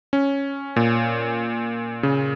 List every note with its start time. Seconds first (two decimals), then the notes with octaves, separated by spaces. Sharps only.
0.13 C#4
0.76 A#2
2.03 C#3